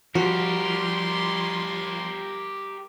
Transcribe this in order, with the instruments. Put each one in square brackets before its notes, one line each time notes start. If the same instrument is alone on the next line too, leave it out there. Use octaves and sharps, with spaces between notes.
[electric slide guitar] F3 [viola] G3 C6 [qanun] F#4 [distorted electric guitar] G4 A#4